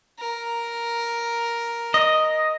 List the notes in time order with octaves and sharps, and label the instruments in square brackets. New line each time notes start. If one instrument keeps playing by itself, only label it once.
[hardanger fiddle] A#4
[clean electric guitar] D#5